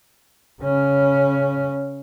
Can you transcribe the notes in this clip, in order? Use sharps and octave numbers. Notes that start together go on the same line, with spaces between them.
C#3 C#4